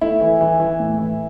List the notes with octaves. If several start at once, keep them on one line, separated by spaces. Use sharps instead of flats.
A3 E4
E3
E3
E3
A2
E3